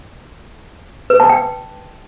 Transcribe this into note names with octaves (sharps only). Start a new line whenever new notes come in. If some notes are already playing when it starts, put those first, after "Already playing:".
B4
A5
G5